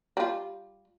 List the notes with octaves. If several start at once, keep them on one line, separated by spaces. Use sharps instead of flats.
G3 F4